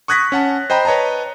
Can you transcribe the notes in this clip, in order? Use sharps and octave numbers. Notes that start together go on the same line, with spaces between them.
C#6 D#6 F#6 G#6 A#6 B6
C#4 F#5 A5
C5 D#5 G5 A#5 B5
B4 C#5 D#5 A5 A#5